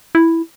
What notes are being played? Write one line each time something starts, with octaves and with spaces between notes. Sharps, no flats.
E4